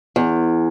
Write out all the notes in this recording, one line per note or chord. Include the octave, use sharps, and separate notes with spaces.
E2